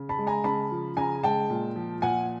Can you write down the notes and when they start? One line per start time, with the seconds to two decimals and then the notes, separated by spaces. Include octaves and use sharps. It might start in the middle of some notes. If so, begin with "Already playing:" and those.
Already playing: C#3
0.09 A5 B5
0.18 G#3
0.27 G#5 A#5
0.44 C#3 A5 B5
0.71 F3
0.97 C#3 G#5 A#5
1.23 G#3 G5 A5
1.50 A#2
1.76 F3
2.02 A#2 F#5 G#5